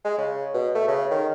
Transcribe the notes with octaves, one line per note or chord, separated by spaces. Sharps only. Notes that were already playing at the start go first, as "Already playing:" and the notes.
G#3
C#3
B2
A3
C#3
D#3